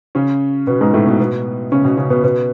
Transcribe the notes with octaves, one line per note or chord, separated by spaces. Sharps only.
C#3 C#4
B2 B3
G#2 G#3
A2 A3
B2 B3
B2 B3
C#3 C#4
B2 B3
C#3 C#4
B2 B3
B2 B3